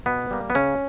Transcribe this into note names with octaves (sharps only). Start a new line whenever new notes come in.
B2 B3
G3 A#3
B3
C#3 C#4